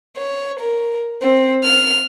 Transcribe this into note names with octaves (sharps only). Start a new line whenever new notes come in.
C#5
A#4
C4
F6